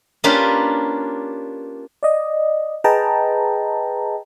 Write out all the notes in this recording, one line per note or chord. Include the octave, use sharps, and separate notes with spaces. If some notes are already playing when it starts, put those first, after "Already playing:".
A#3 C#4 D4 F4 G4 B4
D5 D#5
G#4 B4 D#5 G5 A5 A#5